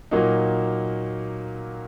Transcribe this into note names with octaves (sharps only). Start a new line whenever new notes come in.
A#2 F#3 A#3 D#4